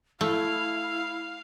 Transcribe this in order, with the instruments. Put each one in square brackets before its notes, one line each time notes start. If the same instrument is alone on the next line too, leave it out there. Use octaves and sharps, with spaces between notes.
[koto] A3 [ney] E4 [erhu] F5